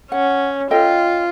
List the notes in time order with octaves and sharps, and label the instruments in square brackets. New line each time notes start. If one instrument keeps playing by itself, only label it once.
[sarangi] C#4 [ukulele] F#5
[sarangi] F4 [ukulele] A4 D#5 G5